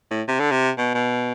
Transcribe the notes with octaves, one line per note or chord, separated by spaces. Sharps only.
A2
C3
D3
C3
B2
B2